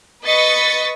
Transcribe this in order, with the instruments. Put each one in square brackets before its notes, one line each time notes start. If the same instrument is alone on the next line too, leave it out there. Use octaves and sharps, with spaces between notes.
[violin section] B4 D#5 C#6 A6 B6 C#7